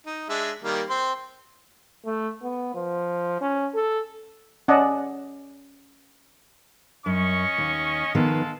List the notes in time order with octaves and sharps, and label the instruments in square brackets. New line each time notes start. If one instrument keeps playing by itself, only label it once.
[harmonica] D#4
G#3 D4 E5
D#3 G3 A#3
C4 C6
[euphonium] A3
B3
F3
C#4
A4
[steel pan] C#4 D5 D#5 F#5 A5
[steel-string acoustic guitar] F#2 [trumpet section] C#4 D#5 C#6
[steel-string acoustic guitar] D#2
[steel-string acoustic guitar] D#3 F3 B3 [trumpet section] G#3 A4 F5